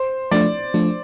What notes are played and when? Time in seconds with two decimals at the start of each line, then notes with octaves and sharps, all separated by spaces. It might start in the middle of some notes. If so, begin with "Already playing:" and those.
Already playing: C5
0.31 F3 A3 D4 D5
0.74 F3 A3 D4